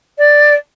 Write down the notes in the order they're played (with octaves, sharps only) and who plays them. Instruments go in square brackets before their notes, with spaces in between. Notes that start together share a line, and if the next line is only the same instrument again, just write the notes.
[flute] D5